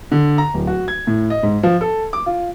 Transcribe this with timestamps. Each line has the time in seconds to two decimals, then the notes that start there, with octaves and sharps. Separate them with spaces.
0.12 D3
0.38 A#5
0.54 D1
0.67 F#4
0.88 G#6
1.07 A2
1.30 D#5
1.43 G#2
1.63 F3
1.81 A4
2.13 D6
2.26 F4